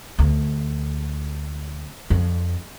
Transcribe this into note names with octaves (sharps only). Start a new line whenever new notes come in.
D2
F2